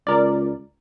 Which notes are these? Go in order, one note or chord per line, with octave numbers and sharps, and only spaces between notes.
C#2 A#4 D5